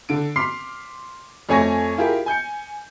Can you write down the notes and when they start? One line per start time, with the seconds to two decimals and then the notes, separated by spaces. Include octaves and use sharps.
0.09 D3 D7
0.36 C6 D6 F6 B6 C7
1.49 F2 A3 C#5 G#5 C#6 A#6
1.97 E4 F4 G4 G#4 A#4
2.26 G#5 G6 C#7